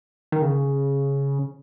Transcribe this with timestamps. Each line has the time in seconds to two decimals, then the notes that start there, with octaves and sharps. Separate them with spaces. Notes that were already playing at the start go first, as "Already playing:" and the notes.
0.32 D#3
0.42 C#3